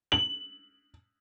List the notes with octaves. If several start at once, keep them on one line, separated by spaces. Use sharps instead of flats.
F#7